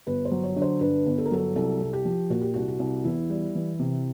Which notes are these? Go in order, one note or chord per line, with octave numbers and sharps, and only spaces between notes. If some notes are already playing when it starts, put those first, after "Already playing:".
G1 B4
C5
F#3
C#5
D3
C5
G2 B4
G1
A4
A#4
F#3 A4
C2 A4
C2
G4
F3
A#2 F#4
G4
C2 F#4
F#4
C2
E2 E4
G3
E3
C3